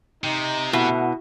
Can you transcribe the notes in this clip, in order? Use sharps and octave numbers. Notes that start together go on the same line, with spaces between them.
C3 D#4
B2 A3 E4 E5 F#5